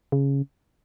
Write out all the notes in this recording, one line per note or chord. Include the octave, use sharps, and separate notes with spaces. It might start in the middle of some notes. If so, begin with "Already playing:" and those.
C#3